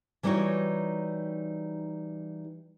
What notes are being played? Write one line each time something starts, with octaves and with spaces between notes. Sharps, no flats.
E3 G3 D#4 F#4 G4 C#5